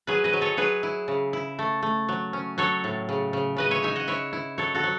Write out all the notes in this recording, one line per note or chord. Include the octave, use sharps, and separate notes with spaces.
F#3 G#4 B4
B4 D#5
F#3
A4 C#5
F#3 G#4 B4
E4
C#3
E4
A3
A3
F#3
C#4
F#3 A4 C#5
A2
C#3
C#3
C#3 B4 D#5
C#5 E5
D#4 E5 G#5
D#5 F#5
E4 C#5 E5
E4
F#3 A4 C#5
F#4 A4
F#3